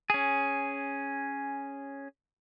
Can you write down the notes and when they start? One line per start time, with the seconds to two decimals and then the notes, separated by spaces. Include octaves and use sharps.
0.10 C#4 G#4